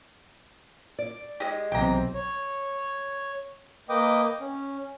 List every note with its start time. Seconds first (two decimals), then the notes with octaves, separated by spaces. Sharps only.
0.99 D5
1.40 G#3 G4 D#5
1.72 B1 C3 E3 C4 G5 A#5
2.14 C#5
3.89 A#3 B4 D#5 G5 D6 D#6
4.41 C#4